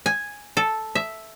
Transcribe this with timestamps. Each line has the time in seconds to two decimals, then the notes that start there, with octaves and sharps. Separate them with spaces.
0.06 G#5
0.57 A4
0.95 E5